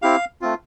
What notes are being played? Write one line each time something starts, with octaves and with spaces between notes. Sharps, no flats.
C4 E4 G4 F5
A3 C4 F4